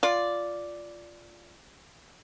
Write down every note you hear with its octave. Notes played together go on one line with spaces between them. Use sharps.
F4 D5